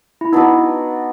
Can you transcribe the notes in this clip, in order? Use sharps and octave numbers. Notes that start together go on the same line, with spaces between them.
E4
B3 D4 D#4 F#4 B4